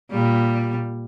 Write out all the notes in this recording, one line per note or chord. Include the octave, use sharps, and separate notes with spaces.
A#2 G3